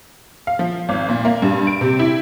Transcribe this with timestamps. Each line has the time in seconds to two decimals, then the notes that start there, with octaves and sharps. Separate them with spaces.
0.47 F5
0.59 F3
0.89 G#1
1.09 A#2
1.25 A#3
1.42 G2
1.67 D7
1.81 C3
1.99 E4